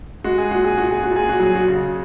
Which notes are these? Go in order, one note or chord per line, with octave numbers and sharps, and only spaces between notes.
G#3 F#4
G#4
A#2 F#4
G#4
A#2 F#4
G#4
F#4
A#2 G#4
F#4
F#3 G#4
F#4
C#3